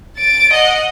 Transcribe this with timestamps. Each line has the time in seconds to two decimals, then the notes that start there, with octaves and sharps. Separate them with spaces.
0.17 A6 D7
0.53 D#5 F#5